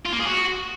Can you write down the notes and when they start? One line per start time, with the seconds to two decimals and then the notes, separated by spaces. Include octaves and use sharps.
0.06 F4
0.13 A#3
0.20 G#4
0.27 F#4